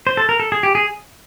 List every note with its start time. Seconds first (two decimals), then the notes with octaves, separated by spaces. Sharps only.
0.07 C5
0.17 A4
0.29 A#4
0.40 A4
0.52 G#4
0.63 G4
0.75 G#4